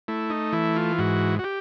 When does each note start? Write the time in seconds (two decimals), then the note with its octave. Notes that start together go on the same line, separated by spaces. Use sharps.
0.08 A3 E4
0.30 D#4
0.53 E3 E4
0.76 F4
0.98 G#2 F#4
1.39 F#4
1.44 G4